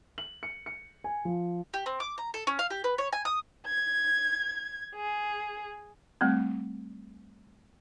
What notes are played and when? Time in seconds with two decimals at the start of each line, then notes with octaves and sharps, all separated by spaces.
0.18 F#7
0.43 C#7
0.66 C#7
1.04 G#5
1.25 F3
1.74 G4
1.86 C4
2.00 D6
2.18 A#5
2.34 A4
2.47 C#4
2.59 F5
2.70 G4
2.84 B4
2.98 C#5
3.13 G#5
3.25 D#6
3.66 G#6
4.95 G#4
6.21 G3 A3 C4